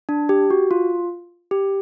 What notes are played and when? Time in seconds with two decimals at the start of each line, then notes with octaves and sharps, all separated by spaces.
0.09 D4
0.29 G4
0.50 F#4
0.71 F4
1.51 G4